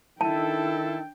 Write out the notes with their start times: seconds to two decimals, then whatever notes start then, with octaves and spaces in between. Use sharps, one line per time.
0.21 D#3 D4 E4 A4 G5 A5